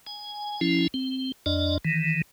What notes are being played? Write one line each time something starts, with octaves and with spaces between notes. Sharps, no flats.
G#5
F3 C#4 E4
C4
F2 D4 D5 D#5
D#3 E3